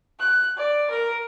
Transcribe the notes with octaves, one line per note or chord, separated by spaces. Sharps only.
F#6
D5
A#4